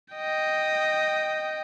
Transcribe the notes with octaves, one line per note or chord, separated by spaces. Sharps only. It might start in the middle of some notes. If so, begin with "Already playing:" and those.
D#5 G5